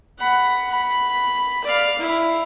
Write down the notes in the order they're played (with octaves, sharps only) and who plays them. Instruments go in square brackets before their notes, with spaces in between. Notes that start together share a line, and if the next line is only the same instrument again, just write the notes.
[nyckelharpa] F#5 B5
B5
D5 F5
E4